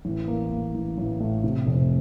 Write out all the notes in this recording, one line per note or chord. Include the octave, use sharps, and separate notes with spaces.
A1
A#3
A#3
A1
A1
A2
C3
F1